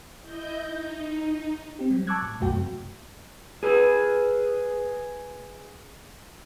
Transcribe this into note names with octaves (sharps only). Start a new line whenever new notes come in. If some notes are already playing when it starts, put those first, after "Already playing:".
E4 D#5 G6
D#4
C4 G4
F#3 G3
A5 C#6 D6 E6 F#6 G#6
A2
C2 F#2 B2 A3 F#4 G5
F#2 C3
G#4 B4